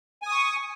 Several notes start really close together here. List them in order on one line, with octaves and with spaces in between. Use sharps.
G#5 D#6 C#6